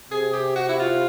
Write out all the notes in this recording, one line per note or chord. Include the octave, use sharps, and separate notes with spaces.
C3 G#4
G4
F#4
E4
F4